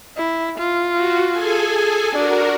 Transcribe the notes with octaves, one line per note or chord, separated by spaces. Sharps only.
E4
F4
F#4
G#4 A4 G#5
D4 F#4 A#4